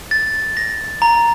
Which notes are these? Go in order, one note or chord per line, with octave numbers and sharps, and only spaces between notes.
A6
A#6
A#5